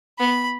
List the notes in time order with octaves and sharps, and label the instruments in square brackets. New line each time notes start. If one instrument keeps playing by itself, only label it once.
[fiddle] B3 [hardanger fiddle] B5